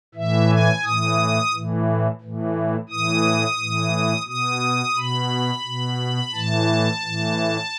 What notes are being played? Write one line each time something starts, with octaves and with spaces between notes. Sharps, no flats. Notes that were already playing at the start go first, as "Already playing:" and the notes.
A2 E3 E5
G#5
A2 E3 D#6
A2 E3
A2 E3
A2 E3 D#6
A2 E3
B2 D#6
B2 B5
B2
A2 E3 A5
A2 E3